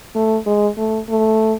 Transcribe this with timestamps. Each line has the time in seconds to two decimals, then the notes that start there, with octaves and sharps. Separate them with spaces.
0.15 A3
0.46 G#3
0.78 A3
1.10 A3